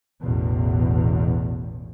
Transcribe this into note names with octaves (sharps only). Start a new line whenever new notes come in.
A1 E2 B2